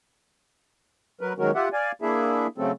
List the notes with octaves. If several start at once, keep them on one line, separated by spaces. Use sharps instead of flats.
F#3 A#4 B4
D#3 F#3 G#3 C#4 F#4 A#4
F4 G4 E5 F#5
D5 F5 G#5
A#3 D4 E4 G#4 E5
C#3 F#3 A3 C4 A4